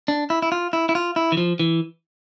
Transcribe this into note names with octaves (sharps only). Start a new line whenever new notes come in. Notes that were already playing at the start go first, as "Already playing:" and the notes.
D4
E4
E4
F4
E4
E4
F4
E4
E3
F3
E3